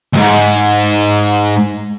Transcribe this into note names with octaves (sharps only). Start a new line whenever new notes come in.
D#2 G#2